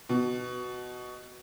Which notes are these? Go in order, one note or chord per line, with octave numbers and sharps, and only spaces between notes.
B2